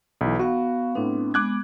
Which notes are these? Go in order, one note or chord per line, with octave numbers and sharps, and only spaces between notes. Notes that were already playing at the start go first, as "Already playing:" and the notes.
B1 E3
B3 F#4 F5
A2 B3 C4 D4
G#3 B3 D6 F#6 G#6